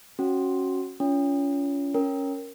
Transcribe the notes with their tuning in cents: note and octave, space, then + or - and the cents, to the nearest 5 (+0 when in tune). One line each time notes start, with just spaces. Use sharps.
C#4 -20 F#4 +0
C#4 +25 F4 -15
C#4 +0 A#4 +0